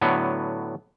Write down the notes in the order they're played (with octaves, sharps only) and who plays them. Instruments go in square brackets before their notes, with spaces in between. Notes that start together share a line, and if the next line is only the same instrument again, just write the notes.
[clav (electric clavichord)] A2 D3 F#3 B3